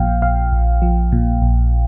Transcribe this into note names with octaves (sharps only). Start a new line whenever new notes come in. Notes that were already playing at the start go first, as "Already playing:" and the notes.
Already playing: A#1 A#2 F3 F5 G5
A#1 F5
A#1
F3
A#2
A#1